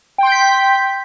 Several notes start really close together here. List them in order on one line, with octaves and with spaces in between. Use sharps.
G5 C6 G6 B6